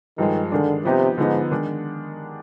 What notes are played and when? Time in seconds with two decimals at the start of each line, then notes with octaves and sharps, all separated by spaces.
0.18 G2 D#3 F3 G#3
0.52 D3 D#3 G#3 D4
0.85 C3 F3 B3 D#4 G4
1.18 G#2 D3 F3 B3 D#4
1.51 D#3 G#3 D4